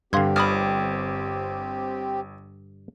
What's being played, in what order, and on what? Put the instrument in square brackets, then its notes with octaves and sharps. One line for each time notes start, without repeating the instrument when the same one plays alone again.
[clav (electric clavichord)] G2 D3 [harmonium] C4 G4 [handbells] F5 C6 G#6
[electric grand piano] G1 [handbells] B5 D#6 F6